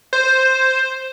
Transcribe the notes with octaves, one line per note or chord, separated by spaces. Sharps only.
C5